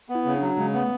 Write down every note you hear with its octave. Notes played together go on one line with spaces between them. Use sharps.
B3
E4
C#3
D4
F#3
C#3 G#3
A3 B3